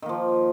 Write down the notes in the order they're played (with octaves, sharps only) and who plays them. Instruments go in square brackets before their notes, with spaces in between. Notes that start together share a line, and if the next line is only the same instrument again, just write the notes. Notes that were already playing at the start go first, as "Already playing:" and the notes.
[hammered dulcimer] D#3
A#3
F3